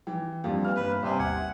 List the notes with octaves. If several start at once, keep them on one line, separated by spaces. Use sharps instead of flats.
E3 G5
F2 G3 A#3 D4 F5
E3 F6
G1 B4
C2 C3 E5 G#5
G#1 D#2 F#5 G#6